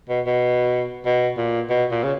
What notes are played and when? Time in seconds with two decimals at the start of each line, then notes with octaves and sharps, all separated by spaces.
0.10 B2
0.26 B2
1.06 B2
1.37 A#2
1.70 B2
1.91 A#2
2.03 C#3